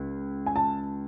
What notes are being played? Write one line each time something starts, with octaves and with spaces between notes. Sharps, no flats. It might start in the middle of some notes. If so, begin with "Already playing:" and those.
Already playing: C#2
G#5
A5